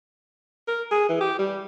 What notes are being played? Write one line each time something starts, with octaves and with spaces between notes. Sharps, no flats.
A#4
G#4
E3
G4
G3